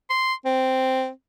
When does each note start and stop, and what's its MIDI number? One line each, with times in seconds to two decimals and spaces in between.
0.10 0.34 84
0.45 1.09 60